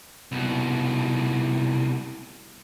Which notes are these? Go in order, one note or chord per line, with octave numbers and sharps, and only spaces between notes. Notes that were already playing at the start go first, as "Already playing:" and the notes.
C2 B2